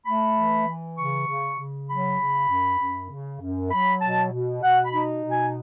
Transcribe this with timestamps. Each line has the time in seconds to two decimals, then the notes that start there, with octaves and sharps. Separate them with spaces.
0.06 A3 B5
0.37 E3
0.67 E3
0.97 C#3 C#6
1.27 C#3
1.58 C#3
1.89 F#3 B5
2.19 C#3
2.49 F#2
2.79 F#2
3.10 C#3
3.40 F#2
3.71 F#3 B5
4.01 B2 A5
4.32 B2
4.62 B2 F#5
4.85 B5
4.92 D#4
5.22 B2
5.30 G#5